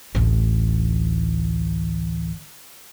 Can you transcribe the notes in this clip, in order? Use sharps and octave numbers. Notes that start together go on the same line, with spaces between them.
A1 D2